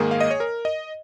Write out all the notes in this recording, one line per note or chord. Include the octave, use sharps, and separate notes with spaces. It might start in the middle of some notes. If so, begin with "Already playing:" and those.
Already playing: G#2 D#3 A#3 G#4
F5
D#5
C#5
A#4
D#5